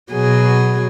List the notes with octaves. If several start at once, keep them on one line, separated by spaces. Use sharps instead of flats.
B2 F#3 G#4